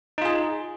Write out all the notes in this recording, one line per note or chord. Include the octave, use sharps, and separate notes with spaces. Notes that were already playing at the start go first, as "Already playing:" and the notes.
D#4 F4 G#4